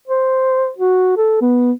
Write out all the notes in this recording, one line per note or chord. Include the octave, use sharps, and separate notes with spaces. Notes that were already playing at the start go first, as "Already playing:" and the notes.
C5
F#4
A4
B3